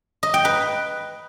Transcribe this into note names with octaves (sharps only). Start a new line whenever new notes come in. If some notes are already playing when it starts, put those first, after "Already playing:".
D#5
G5
B4